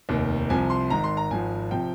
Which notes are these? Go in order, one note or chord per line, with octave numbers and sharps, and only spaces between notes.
F1 D#2 D#3
C2 C3 F3 G#5
C6
G#1 G#2 D#3 A#5
C6
A#5
G#1 G#2 F3 G#5
C3 F3 G5